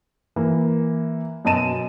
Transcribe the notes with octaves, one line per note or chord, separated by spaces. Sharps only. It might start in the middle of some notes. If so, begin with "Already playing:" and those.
E3 A#3
F#2 B2 D#5 A5 D#7 E7